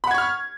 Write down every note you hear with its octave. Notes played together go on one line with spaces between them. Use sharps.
F#5 B5 C#6 F6 G#6